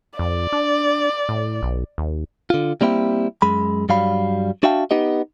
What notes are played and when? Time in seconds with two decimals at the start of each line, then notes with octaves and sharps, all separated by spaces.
0.19 F2 D5
0.52 D4
1.29 A2
1.63 B1
1.98 D#2
2.50 D3 F4
2.81 G3 A#3 C4 E4 G4
3.42 F#2 G#3 B5
3.89 G2 F#3 G3 F5 B5
4.63 D4 F#4 E5 F5 G5 A5
4.91 B3 D#4 G4 D#5